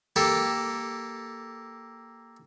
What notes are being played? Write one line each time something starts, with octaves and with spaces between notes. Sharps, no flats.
A#3 G4 A4